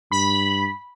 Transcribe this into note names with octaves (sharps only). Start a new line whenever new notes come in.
G2 B5